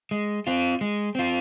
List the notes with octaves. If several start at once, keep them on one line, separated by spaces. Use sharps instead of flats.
G#3
C4 F4
G#3
C4 F4